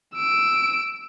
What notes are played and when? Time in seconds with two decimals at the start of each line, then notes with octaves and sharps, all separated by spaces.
0.15 E6 D7